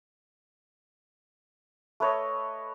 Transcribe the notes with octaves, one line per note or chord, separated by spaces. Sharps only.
A3 B4 C#5 D#5